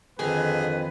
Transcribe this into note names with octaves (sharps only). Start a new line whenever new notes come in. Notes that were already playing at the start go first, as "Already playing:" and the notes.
F2 D3 D#3 G#4 B4 G#5